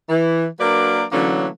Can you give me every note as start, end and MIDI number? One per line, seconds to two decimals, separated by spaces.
0.10 0.45 52
0.60 1.03 54
0.60 1.03 58
0.60 1.03 62
0.60 1.03 70
0.60 1.03 71
0.60 1.03 74
1.12 1.47 50
1.12 1.47 52
1.12 1.47 54
1.12 1.47 57
1.12 1.47 58
1.12 1.47 61